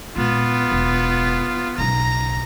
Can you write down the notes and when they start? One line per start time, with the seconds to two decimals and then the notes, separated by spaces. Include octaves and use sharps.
0.16 A#2 G#3 B3 F4
0.72 E1
1.78 B1 C#3 A#5